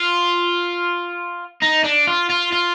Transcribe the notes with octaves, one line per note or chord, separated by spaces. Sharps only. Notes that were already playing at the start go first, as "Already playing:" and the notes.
Already playing: F4
D#4
D4
F4
F4
F4